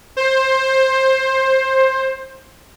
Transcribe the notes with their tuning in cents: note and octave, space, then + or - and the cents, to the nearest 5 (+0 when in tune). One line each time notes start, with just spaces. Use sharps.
C5 +15